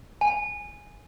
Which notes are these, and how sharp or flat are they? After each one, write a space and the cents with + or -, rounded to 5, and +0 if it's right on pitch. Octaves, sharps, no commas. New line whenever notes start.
G#5 -5